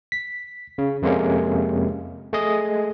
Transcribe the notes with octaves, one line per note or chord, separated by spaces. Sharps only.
B6
C#3
F2 C3 G#3 A#3 C#4
A3 G#4 D#5